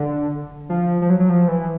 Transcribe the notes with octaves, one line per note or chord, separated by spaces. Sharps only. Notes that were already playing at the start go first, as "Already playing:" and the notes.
Already playing: D3
F3
F3
F#3
F#3
F3
E3